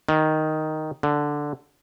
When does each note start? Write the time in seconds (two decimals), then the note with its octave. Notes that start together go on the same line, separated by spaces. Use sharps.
0.09 D#3
1.03 D3